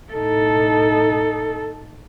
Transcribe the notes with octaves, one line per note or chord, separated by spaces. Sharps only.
A2 D#4 A4